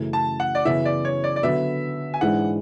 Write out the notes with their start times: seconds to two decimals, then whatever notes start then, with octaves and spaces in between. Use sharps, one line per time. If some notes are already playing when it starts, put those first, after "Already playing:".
Already playing: F#2 C#3 E3 A3
0.13 A5
0.40 F#5
0.55 D5
0.65 F#2 C#3 E3 B3 E5
0.85 D5
1.05 C#5
1.24 D5
1.36 D5
1.43 D3 F#3 B3 E5
2.14 G#5
2.21 G#2 E3 G#3 D4 F#5